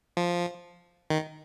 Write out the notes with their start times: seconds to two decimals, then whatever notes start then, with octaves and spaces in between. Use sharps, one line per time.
0.17 F3
1.10 D#3